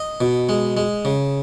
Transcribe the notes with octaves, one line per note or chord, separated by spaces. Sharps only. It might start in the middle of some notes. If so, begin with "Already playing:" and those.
Already playing: D#5
B2
G#3
G#3
C#3